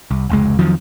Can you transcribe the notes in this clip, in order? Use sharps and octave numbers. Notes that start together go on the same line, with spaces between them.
C2
F1 C#2 G#3
F2 D#3 F3 F#3